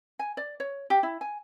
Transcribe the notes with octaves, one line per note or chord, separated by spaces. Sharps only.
G#5
D5
C#5
G4
E4
G#5